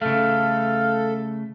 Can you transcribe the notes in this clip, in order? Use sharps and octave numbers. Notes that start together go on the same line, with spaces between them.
C#3 A3 A4 F5